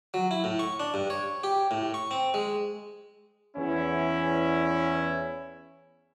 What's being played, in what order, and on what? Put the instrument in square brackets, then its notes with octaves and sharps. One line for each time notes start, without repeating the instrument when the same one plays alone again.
[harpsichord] F#3
E4
A2
C#6
D4
G2
C#5
G4
A2
C#6
C4
G#3
[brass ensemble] E2 C#4 E4